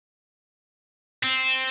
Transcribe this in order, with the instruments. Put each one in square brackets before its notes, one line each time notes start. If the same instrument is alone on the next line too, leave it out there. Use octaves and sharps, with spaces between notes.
[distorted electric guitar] C4